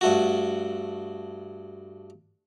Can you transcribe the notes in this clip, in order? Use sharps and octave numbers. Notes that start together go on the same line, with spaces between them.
G2 A3 F#4